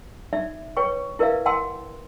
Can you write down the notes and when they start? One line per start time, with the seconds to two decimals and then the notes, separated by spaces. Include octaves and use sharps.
0.33 D#4 D5 E5
0.77 B4 C#5 G5 C#6
1.19 E4 A#4 B4 D5 E5 F5
1.46 F#5 G5 A5 C6 E6